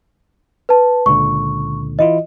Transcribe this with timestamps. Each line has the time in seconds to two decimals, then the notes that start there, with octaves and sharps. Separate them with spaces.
0.69 B4 A5
1.06 C#2 A#2 D3 C#6
1.99 E3 E4 F4 D#5